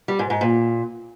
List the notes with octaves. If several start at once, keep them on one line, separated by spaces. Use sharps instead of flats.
G3
G#2
G#2
A#2